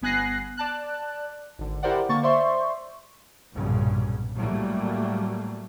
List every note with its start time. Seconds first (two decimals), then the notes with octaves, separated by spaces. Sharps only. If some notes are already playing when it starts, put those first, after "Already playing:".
0.02 G1 B3 G#5 F#6 A#6 C7
0.57 D5 A5 F#6
1.59 G#1 D3
1.83 E4 G4 A#4 C5 D5 F#5
2.09 D3 A#3 C#6 A6
2.23 C5 D5 E5 C6 C#6
3.53 B1 G2 A#2 C#3
4.35 A2 F#3 G3 A3 A#3